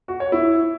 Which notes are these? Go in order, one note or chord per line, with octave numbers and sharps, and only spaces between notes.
F#4
C#5
E4